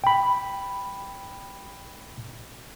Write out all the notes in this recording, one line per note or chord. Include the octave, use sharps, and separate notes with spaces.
G5 B5